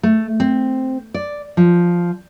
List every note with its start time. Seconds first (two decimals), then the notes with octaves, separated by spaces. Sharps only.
0.03 A3
0.40 C4
1.14 D5
1.57 F3